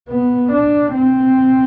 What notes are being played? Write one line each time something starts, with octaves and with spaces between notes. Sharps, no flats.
B3
D4
C4